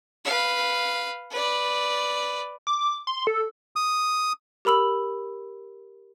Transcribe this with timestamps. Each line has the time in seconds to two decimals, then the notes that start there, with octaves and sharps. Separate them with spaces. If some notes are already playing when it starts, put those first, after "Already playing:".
0.25 B4 F5
1.31 B4 D5
2.67 D6
3.07 C6
3.27 A4
3.76 D#6
4.65 G4 A#4 B5 E6 F#7